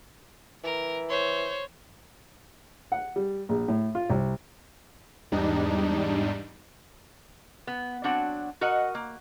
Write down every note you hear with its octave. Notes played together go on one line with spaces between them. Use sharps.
E3 A#4
C5 C#5
F#5
G3
A#1
A2
F4
C2
E2 G#2 G3 D4 D#4
B3
F#3 C4 D4 F#4 F#5
F#4 A#4 D#5 F#5
A#3